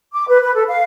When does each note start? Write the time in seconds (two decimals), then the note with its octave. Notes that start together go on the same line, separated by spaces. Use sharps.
0.13 D6
0.28 B4
0.41 B4
0.55 A4
0.68 F5